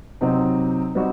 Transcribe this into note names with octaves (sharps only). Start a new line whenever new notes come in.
C3 F#3 C4 D#4
G3 C4 D#4 F#4